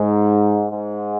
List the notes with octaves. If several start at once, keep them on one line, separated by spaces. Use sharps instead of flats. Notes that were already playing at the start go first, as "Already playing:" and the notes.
Already playing: G#2
G#2